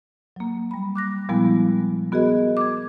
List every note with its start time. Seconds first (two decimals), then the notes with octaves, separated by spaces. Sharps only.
0.36 F#3 A#3
0.71 G3 B5
0.95 D6 F#6 A#6
1.29 A#2 F3 G3 G#3 B3 E4
2.12 B3 F#4 G#4 A#4 D#5
2.57 D6 G#6